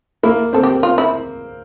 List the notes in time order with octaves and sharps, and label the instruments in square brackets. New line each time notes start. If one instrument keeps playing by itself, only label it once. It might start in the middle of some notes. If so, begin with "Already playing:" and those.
[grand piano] A#3 [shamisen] E4
[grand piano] C4 [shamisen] A4
[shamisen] G4
F4
E4